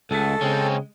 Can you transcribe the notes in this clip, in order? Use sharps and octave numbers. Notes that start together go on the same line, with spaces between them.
C#2 G#3 A3 A4
C#3 G#3 C4 C#4